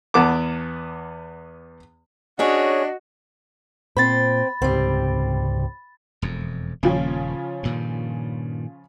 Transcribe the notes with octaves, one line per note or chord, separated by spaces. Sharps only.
E2 B3 A5 D6
C#4 D4 F#4 G#4 C#5 D#5
A#2 C4 C5 B5 A6
C#2 G#2 C3 G3 C4
E1 F2
D#1 C#3 F3 A#3 C#4
G2 A#2 D#3